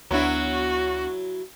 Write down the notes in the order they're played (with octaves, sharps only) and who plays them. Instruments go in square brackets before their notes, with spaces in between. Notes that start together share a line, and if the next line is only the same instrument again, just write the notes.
[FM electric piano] D2 B3 D4 [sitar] F#3 E4 [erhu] F#4